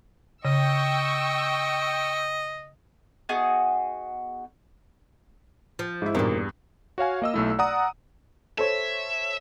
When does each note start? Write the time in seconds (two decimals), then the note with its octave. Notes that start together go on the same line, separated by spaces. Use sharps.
0.45 C#3 D#5 G5 C#6 E6
3.29 B3 D#4 F#4 G#4
5.79 F3
6.02 G#2 E4
6.15 E2 G2 A#2 D#3
6.98 F#4 C#5 F5 G#5
7.22 A#3 D#5 E6
7.34 B1 A3 E4
7.59 D5 F#5 A#5 D#6
8.58 A4 C5 C#5 E5